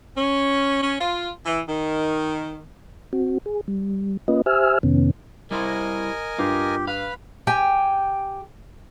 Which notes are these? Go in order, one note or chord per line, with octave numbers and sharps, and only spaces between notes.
C#4
C#4
F4
E3
D#3
C4 F#4
G#4
G3
A#3 C#4 F4 B4 D#5
G4 C5 E5 G#5 E6 F6
F2 C3 D#3 B3 C#4
G3 E4 A#4 C5 D#5 G#5
G2 F4 G4
B4 F5 B5
G4 G5 G#5